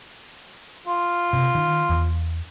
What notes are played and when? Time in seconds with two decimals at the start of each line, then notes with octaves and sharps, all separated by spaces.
0.87 F4
1.33 C3
1.55 D#3
1.89 E2